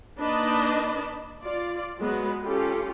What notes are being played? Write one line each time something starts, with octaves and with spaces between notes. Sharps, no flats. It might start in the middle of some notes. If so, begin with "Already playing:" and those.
A#3 D4 D#4 B4 D#5 A5
F4 D5
F#3 G#3 B3 F#4 B4
C#4 F4 G4 A4